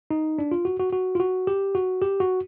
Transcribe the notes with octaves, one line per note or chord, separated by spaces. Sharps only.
D#4
D4
F4
F#4
F#4
F#4
F4
F#4
G4
F#4
G4
F#4